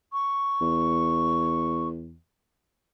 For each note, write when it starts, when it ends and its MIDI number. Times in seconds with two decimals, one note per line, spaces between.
0.13 1.88 85
0.61 2.17 40